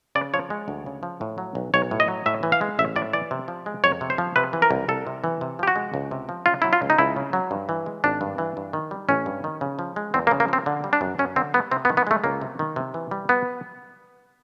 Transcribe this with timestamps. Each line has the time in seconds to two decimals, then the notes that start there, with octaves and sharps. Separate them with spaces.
0.15 C#3 D5
0.34 F3 C#5
0.50 G#3
0.68 D2
0.86 C#3
1.03 F3
1.21 A2
1.38 F#3
1.55 B1
1.74 B1 C#5
1.91 A2
2.00 D#5
2.08 F#3
2.26 A2 E5
2.43 E3
2.52 F5
2.61 G#3
2.79 A1 E5
2.96 A2 D5
3.13 E3 D5
3.31 C3
3.48 F3
3.66 G#3
3.84 F2 C#5
4.01 C3
4.10 C5
4.18 F3
4.36 C3 B4
4.53 E3
4.62 A#4
4.71 C2
4.88 C2 A4
5.07 C3
5.24 E3
5.41 C3
5.59 F3 G4
5.67 F#4
5.76 G#3
5.94 C#2
6.11 C3
6.29 F3
6.46 C#3 F4
6.62 F#3 E4
6.73 F4
6.82 C#2
6.90 D#4
6.98 C#2 E4
7.16 C#3
7.33 F#3
7.51 G2
7.69 E3
7.86 G#3
8.04 G#1 D4
8.21 G2
8.38 E3
8.57 G2
8.73 D#3
8.91 G3
9.09 A1 C#4
9.26 G2
9.44 D#3
9.61 C#3
9.79 F3
9.96 G#3
10.14 E2 C4
10.27 A#3
10.31 C#3
10.40 A#3
10.48 F3 C4
10.66 D3
10.84 G3
10.93 D4
11.01 F#2
11.19 F#2 C#4
11.36 D3 C4
11.54 G3 B3
11.72 C3 C4
11.85 B3
11.90 D#3
11.97 B3
12.07 G#3 A3
12.24 C#2 A#3
12.41 C3
12.59 D#3
12.76 C3
12.94 E3
13.11 G3
13.29 B3